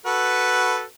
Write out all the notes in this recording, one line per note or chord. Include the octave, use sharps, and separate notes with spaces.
F#4 A4 B4